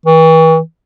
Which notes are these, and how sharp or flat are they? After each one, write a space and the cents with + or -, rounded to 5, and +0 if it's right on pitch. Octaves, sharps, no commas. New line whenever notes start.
E3 -40